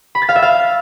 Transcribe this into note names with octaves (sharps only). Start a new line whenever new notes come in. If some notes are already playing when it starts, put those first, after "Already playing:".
B5
A6
F5
E5
F5